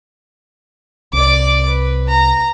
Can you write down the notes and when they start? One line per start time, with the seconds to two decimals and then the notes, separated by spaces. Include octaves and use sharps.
1.13 C2 D5 D6
1.68 B4
2.08 A#5